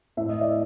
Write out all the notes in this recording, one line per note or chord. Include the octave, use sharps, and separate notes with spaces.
A2 E5
D#5
D5 E5